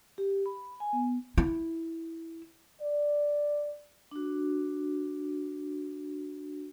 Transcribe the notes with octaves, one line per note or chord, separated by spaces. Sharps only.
G4
B5
G#5
B3
E4
D5
D4 F#4